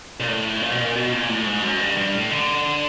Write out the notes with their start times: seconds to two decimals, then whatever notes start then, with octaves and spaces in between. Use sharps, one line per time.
0.20 A#2
0.28 A2
0.61 A#2
0.71 B2
0.80 A#2
0.95 B2
1.12 A#2
1.29 A2
1.46 G#2
1.63 F#2
1.80 G2
1.97 G2
2.14 A2
2.31 D3